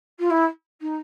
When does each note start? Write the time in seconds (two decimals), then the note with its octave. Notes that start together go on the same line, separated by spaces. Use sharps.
0.19 F4
0.30 E4
0.81 D#4